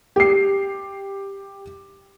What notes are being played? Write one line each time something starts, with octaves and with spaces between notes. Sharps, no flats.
G4 C7